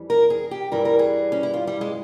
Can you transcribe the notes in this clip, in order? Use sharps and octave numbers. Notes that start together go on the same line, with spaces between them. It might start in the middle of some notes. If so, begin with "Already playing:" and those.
Already playing: F2 E3 G3
A#4
G#4
G4
G2 E3 G3 A#4
A#4
G#4
C#4
E4
F4
G3
G#3